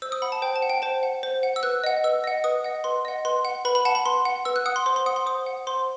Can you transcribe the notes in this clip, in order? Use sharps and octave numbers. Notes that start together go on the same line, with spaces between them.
C5 E6
D#6
F#5 B5
A5
C5 G5
A5
F#5
G5
C5 A5
F#5
C5
F#5
E6
B4 F#6
D#5 F#5
B4 E6
D#5 F#5
B4 D#6
D#5 F#5
B4 C6
D#5 F#5
B4 C6
F#5
B4 B5
B5
F#5 A5
B5
B4 C6
F#5
B4 E6
F#6
F#5 D#6
C6
C5 C6
C6
F#5 D#6
C6
C5 D#6
F#5
C5 C6